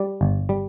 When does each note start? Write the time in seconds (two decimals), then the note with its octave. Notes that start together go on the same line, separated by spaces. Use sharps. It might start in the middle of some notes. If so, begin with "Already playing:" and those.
Already playing: G3 D5
0.21 G1
0.49 G3